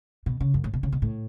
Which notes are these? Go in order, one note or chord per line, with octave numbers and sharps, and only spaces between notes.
B2
C#3
F#2
A2
B2
C#3
B2
A2